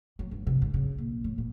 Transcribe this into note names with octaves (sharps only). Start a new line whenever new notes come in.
F#3
G2
C3
G2
C#3
A#1
A2
A#2